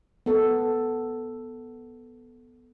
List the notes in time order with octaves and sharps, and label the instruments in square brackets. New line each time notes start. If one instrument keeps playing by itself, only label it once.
[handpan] B3 A4